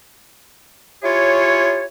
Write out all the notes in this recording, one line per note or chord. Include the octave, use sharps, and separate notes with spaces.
E4 F4 G4 G#4 C#5